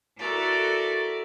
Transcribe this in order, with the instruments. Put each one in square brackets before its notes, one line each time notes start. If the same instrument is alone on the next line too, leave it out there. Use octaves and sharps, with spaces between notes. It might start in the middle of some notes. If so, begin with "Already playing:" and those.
[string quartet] E4 F#4 A4 A#4 D5